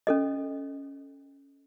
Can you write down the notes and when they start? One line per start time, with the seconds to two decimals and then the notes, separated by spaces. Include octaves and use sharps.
0.07 C#4 A4 D#5